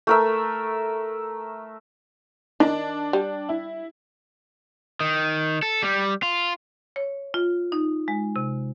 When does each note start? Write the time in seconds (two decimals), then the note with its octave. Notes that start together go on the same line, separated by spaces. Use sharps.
0.07 A3 A#4 E5
2.60 D#3 D4
3.13 G3
3.49 E4
5.01 D#3
5.63 A4
5.83 G3
6.23 F4
6.96 C#5
7.34 F4
7.72 D#4
8.08 G#3
8.36 C3